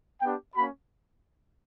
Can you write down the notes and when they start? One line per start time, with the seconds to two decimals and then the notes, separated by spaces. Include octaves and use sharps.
0.22 B3 D4 G4 G5
0.55 A#3 C#4 F#4 B5